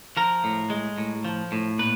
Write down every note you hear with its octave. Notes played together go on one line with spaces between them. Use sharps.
F3 A#4
A2
G#3
A2
F3
A2
A#2 B4